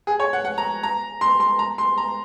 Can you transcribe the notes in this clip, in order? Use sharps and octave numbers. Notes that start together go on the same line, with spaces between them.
G#4
C#5
F#5
F#5
A#5
A#5
C6
C6
A#5
C6
A#5